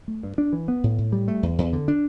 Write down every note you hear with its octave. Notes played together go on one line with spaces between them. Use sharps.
A3
G2
D4
E3
B3
A2
A2
G3
A3
E2
E2
D3
D4